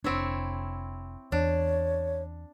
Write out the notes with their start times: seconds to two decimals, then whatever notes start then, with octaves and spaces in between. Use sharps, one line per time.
0.04 F1 C4 D4 E4 C#5
1.32 E2 D4 C#5